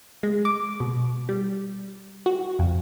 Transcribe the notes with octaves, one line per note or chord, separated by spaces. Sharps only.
G#3
D6
B2
G3
F#4
F2